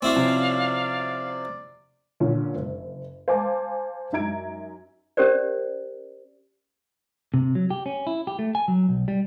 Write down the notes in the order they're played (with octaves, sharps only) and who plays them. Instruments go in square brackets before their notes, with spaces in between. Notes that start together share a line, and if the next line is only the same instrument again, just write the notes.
[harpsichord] C4 E4 F#4 [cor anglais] D5 [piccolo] F5
[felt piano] C3 F3 C#4
[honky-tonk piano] A#2 D3 C#4
F#1
C5 F5 G#5 A5 D6
F#2 D#4 E5 A#5 G#6 D7
[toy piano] C#4 G4 A#4 C5 D5
[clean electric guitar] C3
F#3
G4
C#4
E4
G4
A3
G#5
F#3
B1
G3